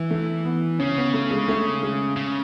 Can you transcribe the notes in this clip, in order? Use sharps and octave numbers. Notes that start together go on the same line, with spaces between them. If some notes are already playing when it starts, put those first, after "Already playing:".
Already playing: E3
A3
B3
C#3 C#4
B3
A3
G#3
A3
G#3
C#3